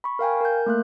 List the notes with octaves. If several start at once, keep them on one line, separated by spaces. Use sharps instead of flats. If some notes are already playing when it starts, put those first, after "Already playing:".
B5 C#6
A#4 F5 G5 G#5
A#4 G6
A3 A#3 F#6